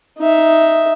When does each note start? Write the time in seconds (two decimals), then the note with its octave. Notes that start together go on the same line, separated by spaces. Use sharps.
0.18 D#4 E5